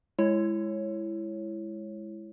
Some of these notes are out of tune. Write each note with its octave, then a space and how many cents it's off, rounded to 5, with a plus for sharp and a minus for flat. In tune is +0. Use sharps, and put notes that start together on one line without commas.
G#3 +0 E4 +20 C#5 -15